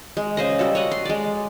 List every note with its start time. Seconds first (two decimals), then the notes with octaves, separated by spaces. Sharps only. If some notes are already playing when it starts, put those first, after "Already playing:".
0.17 G#3
0.37 C#3 C5 D#5
0.59 G3 F#4 A4
0.75 C#5 D#5 F#5
0.91 C6
1.05 G#3 D5